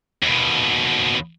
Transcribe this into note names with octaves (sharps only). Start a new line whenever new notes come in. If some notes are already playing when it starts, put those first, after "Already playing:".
D#2 B2